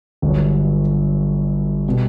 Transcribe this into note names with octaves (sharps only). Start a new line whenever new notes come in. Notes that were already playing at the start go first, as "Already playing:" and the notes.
G1 G2 D3 F#3
B2 G3